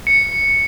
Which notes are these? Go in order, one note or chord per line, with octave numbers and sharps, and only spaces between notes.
C#7